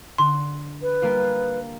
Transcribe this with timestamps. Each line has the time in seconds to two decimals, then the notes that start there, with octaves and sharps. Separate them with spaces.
0.18 D3 C6
0.83 B4
1.02 G3 A#3 F4